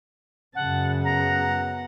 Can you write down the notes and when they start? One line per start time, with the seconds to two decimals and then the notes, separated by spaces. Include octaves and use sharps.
0.55 F#2 C#3 F#5 A5
1.04 B3 F#5 A#5